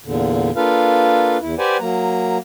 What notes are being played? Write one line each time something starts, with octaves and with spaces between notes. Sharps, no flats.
E2 A#2 D3
A#3 D4 F4 A4 B4 F5
E2 E4
G4 B4 C5 D5 F#5 G#5
F#3 A#3 A#5